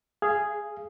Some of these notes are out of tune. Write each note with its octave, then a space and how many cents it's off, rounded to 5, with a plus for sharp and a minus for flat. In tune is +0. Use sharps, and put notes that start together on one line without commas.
G#4 +0 F5 -30